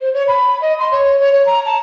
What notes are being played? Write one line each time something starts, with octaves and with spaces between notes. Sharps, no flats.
C5
C#5
B5
D#5
C6
C#5
C#5
C#5
A#5
A5